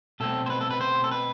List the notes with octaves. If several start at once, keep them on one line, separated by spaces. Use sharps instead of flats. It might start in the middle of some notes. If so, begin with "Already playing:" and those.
B2 A3 C4 A4
C5
B4
A4
B4
C5
A4
B4